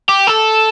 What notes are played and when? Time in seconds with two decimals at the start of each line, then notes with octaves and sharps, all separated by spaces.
0.09 G4
0.27 A4